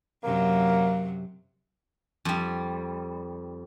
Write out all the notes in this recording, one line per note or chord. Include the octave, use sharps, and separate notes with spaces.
F#2 C3 F#3 A#3
F2 G3